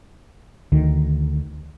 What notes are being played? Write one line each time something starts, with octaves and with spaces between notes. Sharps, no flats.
D2 D#3